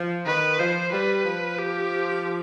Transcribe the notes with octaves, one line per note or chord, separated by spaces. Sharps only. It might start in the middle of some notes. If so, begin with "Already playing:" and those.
Already playing: F3
D#3 B4
F3 C5
G3 B4
F3
G4